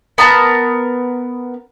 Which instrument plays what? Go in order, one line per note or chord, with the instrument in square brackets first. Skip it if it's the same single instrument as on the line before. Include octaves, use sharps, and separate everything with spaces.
[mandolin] B3 A#4 A5 A#5